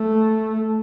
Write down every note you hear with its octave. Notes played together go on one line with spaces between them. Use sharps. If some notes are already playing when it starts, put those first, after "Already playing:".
Already playing: A3